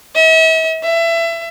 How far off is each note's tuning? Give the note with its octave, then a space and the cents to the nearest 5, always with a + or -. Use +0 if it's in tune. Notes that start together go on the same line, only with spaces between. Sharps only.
E5 -40
E5 +25